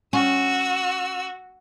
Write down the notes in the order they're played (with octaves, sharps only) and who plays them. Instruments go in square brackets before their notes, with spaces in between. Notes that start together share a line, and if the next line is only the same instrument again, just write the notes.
[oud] C#4 [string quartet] F#4 E6